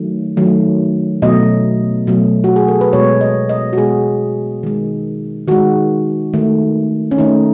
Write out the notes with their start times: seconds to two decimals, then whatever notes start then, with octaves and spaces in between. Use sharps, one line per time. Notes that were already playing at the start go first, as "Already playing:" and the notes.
Already playing: D#3 F#3 A3
0.37 D#3 F#3 A3
1.22 B2 F#3 A3 D#5
2.07 B2 F#3 A3
2.44 F#4
2.56 G#4
2.68 A4
2.81 B4
2.93 B2 G#3 C#5
3.21 D#5
3.49 D#5
3.73 F#4
3.78 B2 G#3 G#4
4.63 D#3 G#3
5.48 D#3 G#3 F#4
6.34 D#3 A3
7.11 C#4
7.18 D#3 A3 D#4